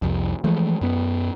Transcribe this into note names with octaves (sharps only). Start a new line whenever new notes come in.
C2 F2
E3 F3 G#3 A3
F#2 B3